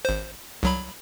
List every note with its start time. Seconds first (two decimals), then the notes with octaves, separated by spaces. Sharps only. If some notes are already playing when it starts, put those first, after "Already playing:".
0.05 G#1 C5
0.63 C2 F#3 B5